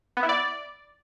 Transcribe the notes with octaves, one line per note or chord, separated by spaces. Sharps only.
B3
E4
D5